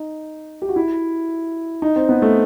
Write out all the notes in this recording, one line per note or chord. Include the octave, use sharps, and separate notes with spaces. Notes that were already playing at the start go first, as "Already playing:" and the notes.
Already playing: D#4
G4
F#4
E4
D#4
C4
B3
A3